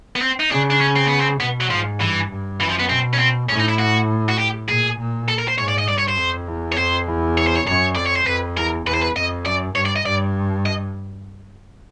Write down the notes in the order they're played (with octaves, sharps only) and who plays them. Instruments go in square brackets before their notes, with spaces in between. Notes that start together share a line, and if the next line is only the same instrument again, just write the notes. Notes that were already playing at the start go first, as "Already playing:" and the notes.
[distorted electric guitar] B3
C4
D#4
[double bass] C#3 [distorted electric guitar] D4
[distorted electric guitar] D4
C#4
C4
B3
C4
[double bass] B2 [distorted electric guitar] B3
[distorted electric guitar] F#3
[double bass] G#2 [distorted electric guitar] F3
[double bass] G2 [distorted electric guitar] E3
[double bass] G2
[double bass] F#2 [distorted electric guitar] E3
[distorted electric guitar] F3
B3
[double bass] B2 [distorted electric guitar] C4
[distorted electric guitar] C#4
C4
[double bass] A2 [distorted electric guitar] C#4
[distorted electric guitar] D#4
E4
F#4
F#4
G4
[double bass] A#2 [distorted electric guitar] G#4
[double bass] A#2
[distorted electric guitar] A4
A#4
C5
[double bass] G#2 [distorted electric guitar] C#5
[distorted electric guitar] D5
D#5
[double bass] G2 [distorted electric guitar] D5
[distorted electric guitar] C#5
C5
[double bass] F2
E2
[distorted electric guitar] C#5
[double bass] F2 [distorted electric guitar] C5
[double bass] E2
[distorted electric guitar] C#5
C5
C#5
[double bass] F#2 [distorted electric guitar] C#5
[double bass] F2 [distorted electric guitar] D5
[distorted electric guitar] C#5
C5
[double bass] F2 [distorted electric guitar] B4
[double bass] E2 [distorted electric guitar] A#4
[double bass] E2 [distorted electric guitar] B4
[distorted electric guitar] C5
B4
[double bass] F2 [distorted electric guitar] D#5
[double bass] F#2 [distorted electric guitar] D5
[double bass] G2 [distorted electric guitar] C#5
[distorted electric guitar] D5
D#5
[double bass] G2 [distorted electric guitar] D5
[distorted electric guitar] D#5